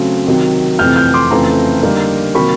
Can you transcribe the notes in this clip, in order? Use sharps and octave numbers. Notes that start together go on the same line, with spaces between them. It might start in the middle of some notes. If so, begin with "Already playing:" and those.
Already playing: C#3 F#3 A3 C4
C3 D#3 F#3
F2 C3 E3 A3 F6 G6
F6 G6
C6 D6
F2 C#3 E3 A3 C4 A#5 C6
D3 G3 A#3 D#4
C3 D#3 F#3 A#3 B5 C#6